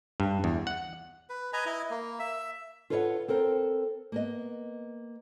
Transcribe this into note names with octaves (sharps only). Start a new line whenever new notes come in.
G2
E2
F#5
B4
B4 D#5 G#5 A#5
E4 D#5
A#3
E5
F4 A4 B4 C#5 E5 F#5
C4 A4 A#4 C5
A#3 B3 D#5